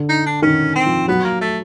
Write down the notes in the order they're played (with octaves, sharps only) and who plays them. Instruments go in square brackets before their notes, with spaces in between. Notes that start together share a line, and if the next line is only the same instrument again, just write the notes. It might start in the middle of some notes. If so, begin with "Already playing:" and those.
Already playing: [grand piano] D3
[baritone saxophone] D#4
D4
[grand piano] D#3 [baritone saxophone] C#4
[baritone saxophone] C4
[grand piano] F3
[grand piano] F#3 [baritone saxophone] B3
[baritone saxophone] A#3
A3